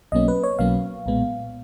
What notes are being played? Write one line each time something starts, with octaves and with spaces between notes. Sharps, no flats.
B1 B2 F#3 A#3 C#4 D#5
B4
C#5
B1 B2 F#3 A#3 C#4 F5
B1 A#2 G#3 B3